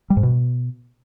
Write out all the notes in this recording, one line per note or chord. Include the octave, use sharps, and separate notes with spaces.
G3
G#2
B2